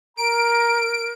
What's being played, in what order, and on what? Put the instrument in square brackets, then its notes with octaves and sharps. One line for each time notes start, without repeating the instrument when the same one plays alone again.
[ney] A#4 [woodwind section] A#5 [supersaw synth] D7